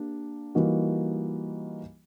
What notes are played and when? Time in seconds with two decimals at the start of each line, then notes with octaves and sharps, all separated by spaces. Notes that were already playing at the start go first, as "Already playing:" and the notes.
Already playing: A#3 D4 G4
0.55 E3 G3 A#3 D#4 F#4